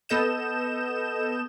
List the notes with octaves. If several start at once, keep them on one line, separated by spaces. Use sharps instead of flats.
B3 A4 D#5 G6 E7